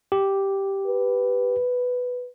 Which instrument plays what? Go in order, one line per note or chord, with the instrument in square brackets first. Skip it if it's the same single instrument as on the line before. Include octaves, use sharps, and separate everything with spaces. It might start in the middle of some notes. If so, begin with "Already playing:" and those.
[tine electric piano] G4
[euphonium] B4